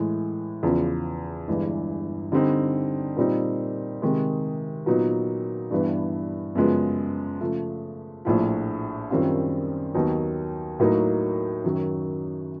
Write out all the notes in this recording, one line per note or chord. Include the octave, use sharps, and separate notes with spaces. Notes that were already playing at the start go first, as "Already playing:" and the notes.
Already playing: A2 E3 G#3
E2 C#3 F3
G1 G2 E3 G#3
D3 G3 C4 D#4
A#2 G3 C4 D#4
C3 D#3 G#3
A#2 F#3 B3 D#4
G2 E3 G3 B3 D4
F#2 C#3 F3 G#3 B3
C#3 F3 A3
A#1 A2 F3
F#2 D#3 G3 C4 F4
D#2 D#3 F#3 B3 D#4
A2 F#3 A#3 D#4
F#2 D#3 F#3